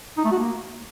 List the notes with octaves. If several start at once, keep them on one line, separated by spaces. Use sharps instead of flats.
D#4
A3
F#4
A#3